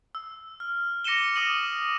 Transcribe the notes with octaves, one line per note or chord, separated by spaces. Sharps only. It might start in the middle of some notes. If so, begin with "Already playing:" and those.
E6
F6
D6 A#6 C#7 D#7 E7 G7
D6 D#6 A#6 D#7 F#7 G7